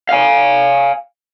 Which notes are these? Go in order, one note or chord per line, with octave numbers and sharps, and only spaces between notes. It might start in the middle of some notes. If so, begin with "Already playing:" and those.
F5 G#5